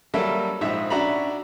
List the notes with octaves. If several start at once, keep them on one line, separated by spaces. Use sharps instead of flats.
F#3 G3 A#3 A4 E5
A#1 G#2 D#4 E5 E6
C#4 D4 F#4 E5 A#5 B5